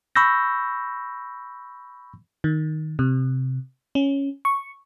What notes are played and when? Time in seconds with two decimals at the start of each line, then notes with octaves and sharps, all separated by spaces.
0.16 B5 C#6 E6 G6 A#6
2.44 D#3
2.99 C3
3.95 C#4
4.45 C#6